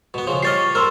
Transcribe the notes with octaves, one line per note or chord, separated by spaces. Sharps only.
B2 B3
C#3 F3
G4 C#5 D#5 F6 A6 C7
A#4 C5 C6 E6 F6